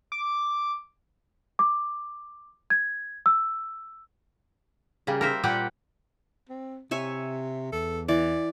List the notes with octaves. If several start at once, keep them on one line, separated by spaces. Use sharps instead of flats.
D6
D6
G#6
E6
C#3 G3 A#3
A#4 C5 E5
A#2 G3 G4 F#5 G5
C4
C3 C#5 E5 G#5
E2 A4
E3 D5